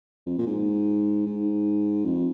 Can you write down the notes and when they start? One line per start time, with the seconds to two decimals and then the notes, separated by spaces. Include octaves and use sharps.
0.26 F2
0.38 A#2
0.47 G#2
1.27 G#2
2.05 F2